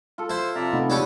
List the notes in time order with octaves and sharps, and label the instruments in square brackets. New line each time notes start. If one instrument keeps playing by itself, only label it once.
[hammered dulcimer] F4 A4
[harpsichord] E4 [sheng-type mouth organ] C5 C6
[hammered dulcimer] C3 F3 [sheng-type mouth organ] D5 E5 A#5
[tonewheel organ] C3 A3 D#4 [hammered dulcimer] B3
[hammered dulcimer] C#3 B4 [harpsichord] D4 G4 [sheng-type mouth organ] A4 C#5